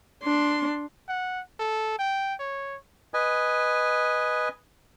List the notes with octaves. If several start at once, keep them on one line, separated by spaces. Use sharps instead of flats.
D4 C6
F#5
A4
G5
C#5
B4 D#5 G#5